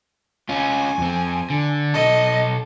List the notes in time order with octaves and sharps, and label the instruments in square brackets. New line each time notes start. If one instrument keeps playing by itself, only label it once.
[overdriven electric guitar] C#4 F4 [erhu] G#5
[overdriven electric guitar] F2 C4
D3
[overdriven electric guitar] B1 A4 [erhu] D#5